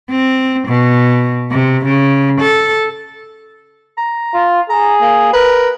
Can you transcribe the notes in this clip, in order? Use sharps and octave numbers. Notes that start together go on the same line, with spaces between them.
C4
B2
C3
C#3
A4
A#5
F4
G#4 A#5
A#3
A#4 B4